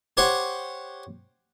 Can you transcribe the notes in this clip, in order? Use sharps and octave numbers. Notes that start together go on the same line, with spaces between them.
G4 C5 C#5 F#5